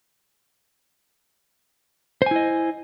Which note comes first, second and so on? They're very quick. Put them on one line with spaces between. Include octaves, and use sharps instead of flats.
C5 G#5 E4 D#5